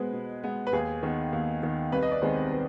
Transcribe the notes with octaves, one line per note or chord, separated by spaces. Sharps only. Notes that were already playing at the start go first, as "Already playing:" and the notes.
Already playing: B2 G#3 B3 B4 C5
B2
G#3 B3
B4
D#2 G#4
D#3 B3
D#2
D#3 B3
C2 B4
D#5
D5
C3 D#3 G#3 B3 G#4 C5
B4